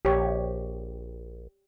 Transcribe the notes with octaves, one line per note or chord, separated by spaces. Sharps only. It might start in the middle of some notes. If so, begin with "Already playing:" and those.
A#1 G4 C#5